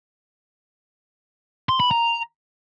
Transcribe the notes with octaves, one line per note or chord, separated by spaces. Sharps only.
C6
B5
A#5